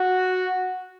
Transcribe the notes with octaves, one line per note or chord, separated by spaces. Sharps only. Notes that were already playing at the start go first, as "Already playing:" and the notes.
Already playing: F#4